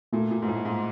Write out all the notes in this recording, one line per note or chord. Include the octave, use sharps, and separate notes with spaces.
A#2 A3
A#2
G#2
A2 F4
G#2